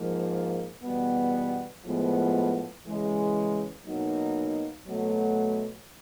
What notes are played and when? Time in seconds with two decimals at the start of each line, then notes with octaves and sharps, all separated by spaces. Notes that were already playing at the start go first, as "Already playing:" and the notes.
Already playing: G#2 F3 A#3
0.83 E2 B2 G3 B3
1.85 A2 F3 G#3 B3
2.86 C#3 E3 G#3
3.85 B2 F#3 A#3 D#4
4.87 B2 F#3 A3